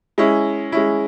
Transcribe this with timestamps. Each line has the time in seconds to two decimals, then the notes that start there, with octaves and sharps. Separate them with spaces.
0.18 G#3 C#4 E4
0.72 G#3 C#4 E4